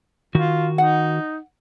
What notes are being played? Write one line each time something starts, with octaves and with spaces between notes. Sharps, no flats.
D#3 F4 F#4
D#4 F#5